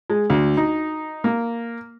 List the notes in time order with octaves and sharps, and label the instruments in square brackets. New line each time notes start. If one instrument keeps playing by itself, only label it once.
[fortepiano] G#3
D2
D#4
A#3